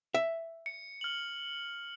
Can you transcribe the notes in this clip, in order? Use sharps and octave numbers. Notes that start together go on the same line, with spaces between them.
E5
C#7
F6 F#7